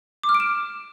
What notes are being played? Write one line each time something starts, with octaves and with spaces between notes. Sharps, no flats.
D6
F6
D7
E7